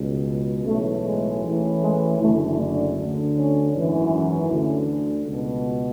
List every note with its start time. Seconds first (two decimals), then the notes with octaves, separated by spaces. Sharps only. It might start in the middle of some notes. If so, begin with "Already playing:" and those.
Already playing: C#2 B2
0.66 B1 A2 E3 A3
1.05 G#3
1.43 A1 A2 E3
1.81 G#3
2.20 F#1 F#2 D3 A3
2.58 D4
2.97 D2 D3
3.35 C#4
3.73 G#1 F#2 E3
4.11 C#4
4.50 D2 D3
5.26 C#2 B2